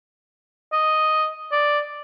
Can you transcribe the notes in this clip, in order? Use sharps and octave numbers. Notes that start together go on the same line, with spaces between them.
D#5
D5